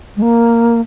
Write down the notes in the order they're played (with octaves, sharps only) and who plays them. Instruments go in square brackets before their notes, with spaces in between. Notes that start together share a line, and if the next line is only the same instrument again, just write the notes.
[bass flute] G#3
A#3